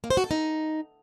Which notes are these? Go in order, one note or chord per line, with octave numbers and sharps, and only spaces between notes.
A#3
C5
F#4
A4
D#4